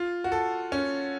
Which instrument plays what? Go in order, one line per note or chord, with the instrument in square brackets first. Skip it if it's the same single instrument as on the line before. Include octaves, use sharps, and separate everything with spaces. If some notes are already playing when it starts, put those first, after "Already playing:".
Already playing: [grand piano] F4
F#4
A4
C#4